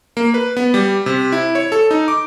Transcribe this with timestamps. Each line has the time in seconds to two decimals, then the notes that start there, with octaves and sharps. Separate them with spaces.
0.17 A#3
0.34 B4
0.57 B3
0.74 G3
1.06 C3
1.32 E4
1.55 C#5
1.72 A4
1.91 D#4
2.08 D6